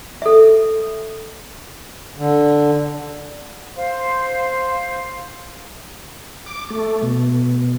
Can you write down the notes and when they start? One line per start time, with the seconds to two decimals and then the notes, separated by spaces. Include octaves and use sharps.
0.22 A4 E5
2.18 D3
3.76 C5 F5
6.46 D6
6.70 A3
7.02 B2